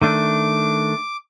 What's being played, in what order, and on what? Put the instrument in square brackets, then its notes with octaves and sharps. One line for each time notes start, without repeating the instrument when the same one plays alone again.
[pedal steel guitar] D#3 A3 D4 [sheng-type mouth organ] D6